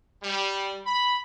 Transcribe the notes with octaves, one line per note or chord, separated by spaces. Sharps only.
G3
B5